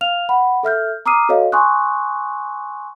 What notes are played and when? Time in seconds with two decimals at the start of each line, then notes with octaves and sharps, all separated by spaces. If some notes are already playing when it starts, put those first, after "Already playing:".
0.01 F5 F6 F7
0.29 F#5 B5
0.63 A4 E5 F6 G6
1.06 A#5 D6 D#6 F6 C7 D#7
1.29 F#4 A4 C#5 D#5 F5
1.52 G#5 C6 C#6 D#6 F#6